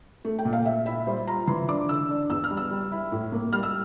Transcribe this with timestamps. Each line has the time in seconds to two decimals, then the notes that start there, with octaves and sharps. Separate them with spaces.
0.25 A3
0.39 G5
0.45 A#2
0.53 F5
0.66 A#2 E5
0.86 E4 E5
1.07 G3 C5
1.27 F4 A#5
1.47 E3 C6
1.68 D4 D6
1.89 D3 E6
2.09 D4
2.30 E2 E6
2.44 F6
2.51 G3
2.57 E6
2.71 G3
2.92 E4
3.12 A2
3.32 A#3
3.52 G3 F6
3.63 E6